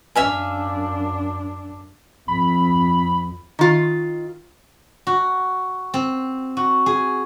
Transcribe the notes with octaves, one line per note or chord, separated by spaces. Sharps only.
F#2 D4 E5 F5 G#5
F2 B5
D#3 F4
F#4
C4
F#4
G#4